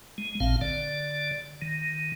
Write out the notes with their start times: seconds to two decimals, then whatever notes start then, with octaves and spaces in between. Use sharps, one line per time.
0.18 G#3
0.40 A1 A#2 C4 F5
0.61 D3 D5
1.62 D#3